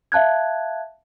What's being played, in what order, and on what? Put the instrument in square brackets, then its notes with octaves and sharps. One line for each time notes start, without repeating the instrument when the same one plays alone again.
[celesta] E5 F5 A5 F#6 G#6